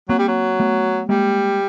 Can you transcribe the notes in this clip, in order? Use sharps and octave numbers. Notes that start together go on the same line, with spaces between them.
F#3 A#3 C4
G3
F#3
A3 B3
G3 G#3 A#3